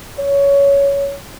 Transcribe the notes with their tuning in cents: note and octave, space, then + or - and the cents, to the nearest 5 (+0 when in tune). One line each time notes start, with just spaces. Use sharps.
C#5 +15